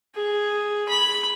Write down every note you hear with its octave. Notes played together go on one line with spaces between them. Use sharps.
G#4
B5